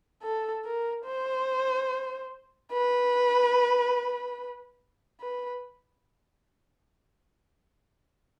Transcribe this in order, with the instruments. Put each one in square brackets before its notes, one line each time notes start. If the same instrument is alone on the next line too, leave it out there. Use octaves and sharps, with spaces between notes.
[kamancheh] A4
A#4
C5
B4
B4